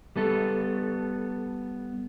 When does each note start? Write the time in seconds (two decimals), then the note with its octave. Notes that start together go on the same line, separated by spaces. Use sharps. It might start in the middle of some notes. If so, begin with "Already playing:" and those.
0.16 G3 B3 A4